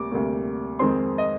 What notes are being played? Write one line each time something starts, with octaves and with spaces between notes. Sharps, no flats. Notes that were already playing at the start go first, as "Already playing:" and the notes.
Already playing: D2 C3 G3 A#3 D6
D2 C3 G3 A#3
F2 D#3 G#3 C4 C6
D#5